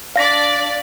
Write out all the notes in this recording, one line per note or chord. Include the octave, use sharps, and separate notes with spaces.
D4 D5 F5 A#6 B6